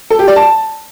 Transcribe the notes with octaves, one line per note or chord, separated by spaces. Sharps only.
A4
G4
D5
A5